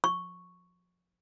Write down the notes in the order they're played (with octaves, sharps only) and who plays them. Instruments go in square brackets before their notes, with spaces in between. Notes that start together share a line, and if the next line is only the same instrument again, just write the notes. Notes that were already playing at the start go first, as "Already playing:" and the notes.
[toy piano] C#6